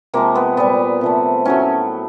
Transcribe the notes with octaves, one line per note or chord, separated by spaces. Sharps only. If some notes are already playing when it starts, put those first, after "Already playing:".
C3 F3 G#3 A#3
B3
A#2 G3 B3
C3 F3 A3
A2 F#3 A3 C#4